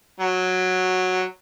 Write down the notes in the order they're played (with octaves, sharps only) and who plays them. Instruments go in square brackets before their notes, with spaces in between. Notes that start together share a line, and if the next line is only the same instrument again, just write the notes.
[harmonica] F#3